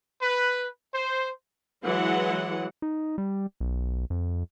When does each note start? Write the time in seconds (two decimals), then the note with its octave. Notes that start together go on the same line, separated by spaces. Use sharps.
0.22 B4
0.95 C5
1.84 E3 F#3 G#3 F#5
2.82 D#4
3.18 G3
3.60 B1
4.10 F2